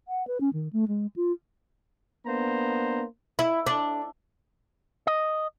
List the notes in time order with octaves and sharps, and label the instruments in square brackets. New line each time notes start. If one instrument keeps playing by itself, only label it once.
[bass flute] F#5
B4
C#4
D#3
A3
G#3
F4
[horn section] A#3 B3 D4 C5 A#5
[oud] E4
D4
[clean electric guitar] D#5